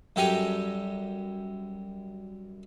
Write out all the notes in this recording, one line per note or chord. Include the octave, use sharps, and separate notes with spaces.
F#2 G3 A4 G5 G#5 A#5